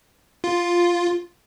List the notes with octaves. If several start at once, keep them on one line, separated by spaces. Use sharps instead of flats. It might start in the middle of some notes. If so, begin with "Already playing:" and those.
F4